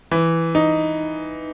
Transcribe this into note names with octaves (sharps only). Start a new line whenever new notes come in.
E3
D#4